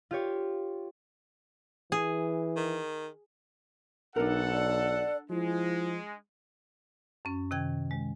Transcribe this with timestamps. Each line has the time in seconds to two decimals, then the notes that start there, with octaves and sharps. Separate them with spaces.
0.11 F4 G4 C#5
1.92 E3 G#4
2.57 D#3
4.16 B1 D4 D#4 A4 A#4 F#5
4.53 D5
5.30 F3 G#3 E4
7.25 F#2 C#4
7.51 C3 D#3 G5 G#6
7.91 G#3